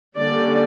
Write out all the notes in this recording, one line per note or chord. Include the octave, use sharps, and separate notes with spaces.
D3 G3 A#3 C#4 D5